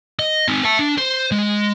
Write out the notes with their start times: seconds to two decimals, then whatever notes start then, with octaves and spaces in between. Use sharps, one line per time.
0.19 D#5
0.48 C4 D#4
0.65 E5 A5
0.79 D4
0.98 C5
1.32 G#3